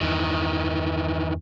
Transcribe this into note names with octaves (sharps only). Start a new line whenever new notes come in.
E2 G2 D#3 E3